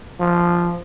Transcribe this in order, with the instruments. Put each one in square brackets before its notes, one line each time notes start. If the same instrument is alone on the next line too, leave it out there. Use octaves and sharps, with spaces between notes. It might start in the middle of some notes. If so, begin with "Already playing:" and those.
[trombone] F3